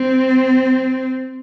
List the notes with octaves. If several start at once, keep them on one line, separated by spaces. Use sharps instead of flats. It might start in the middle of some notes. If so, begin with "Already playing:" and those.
Already playing: C4